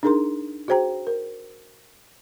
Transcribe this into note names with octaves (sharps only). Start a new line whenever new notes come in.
D4 D#4 G#4 A#4 A#5 C6
F#4 G#4 C5 G5 A#5
A#4